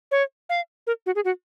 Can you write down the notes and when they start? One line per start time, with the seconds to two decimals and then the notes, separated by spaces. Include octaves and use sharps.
0.11 C#5
0.49 F5
0.87 A#4
1.06 F#4
1.15 G#4
1.25 F#4